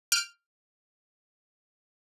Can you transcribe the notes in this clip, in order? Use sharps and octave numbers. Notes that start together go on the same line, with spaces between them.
F6 G6 D7